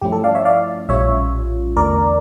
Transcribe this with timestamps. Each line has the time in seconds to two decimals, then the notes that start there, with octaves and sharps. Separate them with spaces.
0.01 G2 F3 A3 C#4 E4 G4
0.12 A4
0.24 D5 F5
0.35 C#5 E5
0.45 D5 F5
0.89 A#1 A2 G3 C#4 F4 C#5 E5
1.76 E2 D3 A3 A#4 D5